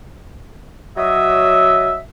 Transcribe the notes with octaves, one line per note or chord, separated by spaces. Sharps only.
F#3 D#5 E5